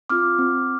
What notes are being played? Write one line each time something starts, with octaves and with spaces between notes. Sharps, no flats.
C4 F4 D6 F6
C4